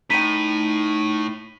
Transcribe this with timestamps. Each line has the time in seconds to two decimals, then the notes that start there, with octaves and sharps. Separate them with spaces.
0.10 A2 D#4 G5 B6 D#7